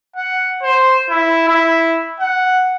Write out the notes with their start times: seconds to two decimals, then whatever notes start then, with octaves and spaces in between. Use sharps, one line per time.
0.16 F#5
0.63 C5
1.10 E4
1.48 E4
2.20 F#5